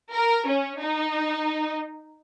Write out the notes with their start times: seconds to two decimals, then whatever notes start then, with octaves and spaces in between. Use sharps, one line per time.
0.13 A#4
0.47 C#4
0.79 D#4